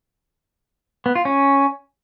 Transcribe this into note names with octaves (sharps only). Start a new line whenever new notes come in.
B3
F4
C#4